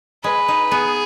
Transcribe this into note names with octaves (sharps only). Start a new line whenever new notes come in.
G#3 B4
D#4
B3 G#4